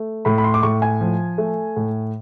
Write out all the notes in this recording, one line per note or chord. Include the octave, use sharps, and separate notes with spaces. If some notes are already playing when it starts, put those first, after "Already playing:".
Already playing: A3
A2 B5
B5
C6
D6
A2 C#6
G#5
F3
A3
A2